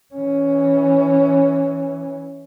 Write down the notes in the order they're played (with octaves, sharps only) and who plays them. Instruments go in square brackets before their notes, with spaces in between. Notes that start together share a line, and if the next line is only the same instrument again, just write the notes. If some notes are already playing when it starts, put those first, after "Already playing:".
[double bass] E3 C#4